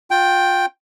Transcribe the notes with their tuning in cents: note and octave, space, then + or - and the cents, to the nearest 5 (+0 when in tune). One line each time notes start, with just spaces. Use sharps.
F4 +30 G5 +0